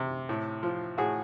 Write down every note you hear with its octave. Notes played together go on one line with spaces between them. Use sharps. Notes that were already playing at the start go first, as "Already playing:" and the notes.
Already playing: C3
A2
F3
A2 F#4 G#4